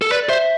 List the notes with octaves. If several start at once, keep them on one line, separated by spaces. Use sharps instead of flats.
A4
B4 D5
D5
C5 E5